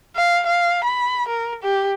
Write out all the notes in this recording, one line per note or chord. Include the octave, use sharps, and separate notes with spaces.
F5
F5
B5
A#4
G4